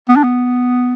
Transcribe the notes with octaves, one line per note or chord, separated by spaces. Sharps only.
B3
D4
B3